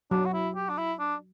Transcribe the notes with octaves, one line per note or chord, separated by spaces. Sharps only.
F#3 D4
F#4
E4
G4
D4
E4
D4